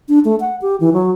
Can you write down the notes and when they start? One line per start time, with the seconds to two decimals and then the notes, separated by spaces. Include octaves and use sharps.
0.09 D4
0.25 A3
0.40 F#5
0.62 G4
0.80 E3
0.93 F#3